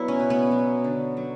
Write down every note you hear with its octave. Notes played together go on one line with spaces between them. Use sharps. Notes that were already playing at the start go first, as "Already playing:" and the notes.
Already playing: F#3 B3 E4
C#4
B2
B3
F#3
D3
F#3